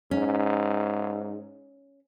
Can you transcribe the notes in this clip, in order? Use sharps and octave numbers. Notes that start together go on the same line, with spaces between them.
G#2 C#4